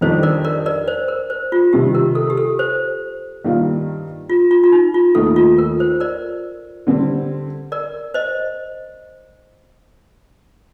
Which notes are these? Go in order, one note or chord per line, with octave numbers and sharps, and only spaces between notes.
F2 D#3 G3 D4 G4 C5
A#4 D5
A#4 D5
A#4 D5
C5
A#4
C5
F4
C3 D#3 G3 G4
A#4
A4
G4
A4
C5
G2 D#3 G3 A#3 F4
F4
F4
F4
D#4
F4
D#2 D#3 A3 D#4 A4
F4
A#4
C5
A#4 D5
D3 G3 C4
A#4 D5
C5 D#5